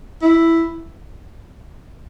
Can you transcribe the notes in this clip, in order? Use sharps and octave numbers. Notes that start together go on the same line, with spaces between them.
E4